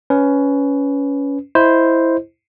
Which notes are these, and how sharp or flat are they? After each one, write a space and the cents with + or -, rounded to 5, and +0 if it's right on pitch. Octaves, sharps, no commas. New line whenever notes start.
C#4 +15 B4 +10
E4 +0 C5 +0 D#5 +0